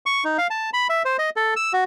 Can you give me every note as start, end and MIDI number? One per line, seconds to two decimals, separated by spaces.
0.06 0.24 85
0.24 0.37 63
0.38 0.47 77
0.50 0.70 81
0.73 0.87 83
0.89 1.03 76
1.05 1.17 72
1.19 1.30 75
1.36 1.54 69
1.56 1.73 88
1.73 1.84 66